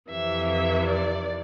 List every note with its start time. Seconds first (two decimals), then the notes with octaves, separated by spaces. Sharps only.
0.10 F2 C3 E3 E5
0.49 E5
0.88 D5